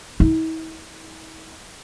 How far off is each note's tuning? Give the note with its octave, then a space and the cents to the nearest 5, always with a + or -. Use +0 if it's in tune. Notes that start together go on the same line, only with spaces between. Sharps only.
E4 -45